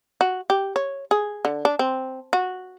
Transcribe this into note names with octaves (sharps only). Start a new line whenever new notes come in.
F#4
G4
C#5
G#4
D3
D4
C4
F#4